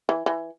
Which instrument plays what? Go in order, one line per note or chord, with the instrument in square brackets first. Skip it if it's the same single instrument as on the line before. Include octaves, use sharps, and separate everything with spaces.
[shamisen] E3
E3